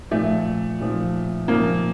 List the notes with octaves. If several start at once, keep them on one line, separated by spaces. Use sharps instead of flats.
A#2 F3 A3
A#2 F3
A#2 F3 A#3